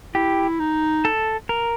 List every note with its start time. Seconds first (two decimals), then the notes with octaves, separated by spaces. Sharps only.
0.15 E4 G4
0.60 D#4
1.05 A4
1.49 A#4